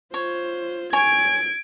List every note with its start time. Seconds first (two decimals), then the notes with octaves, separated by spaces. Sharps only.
0.14 F4 C5 C#5
0.93 C#5 G#5 G#6 D7